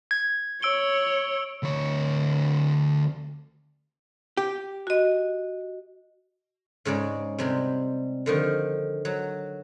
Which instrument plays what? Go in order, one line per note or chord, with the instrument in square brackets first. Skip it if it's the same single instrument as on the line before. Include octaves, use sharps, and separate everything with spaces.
[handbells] G#6
[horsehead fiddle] C#5 [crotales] E6 D7 G7
[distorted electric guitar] D2 C#5
[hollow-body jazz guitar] G4
[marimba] F#4 D#5
[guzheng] G#2 C#3 G#3 D5
C3 G3 G#3
D3 D#3 F3
F#3